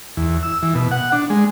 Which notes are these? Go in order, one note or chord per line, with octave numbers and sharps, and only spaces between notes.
E2
E6
E3
B2
F#5
D4
G#3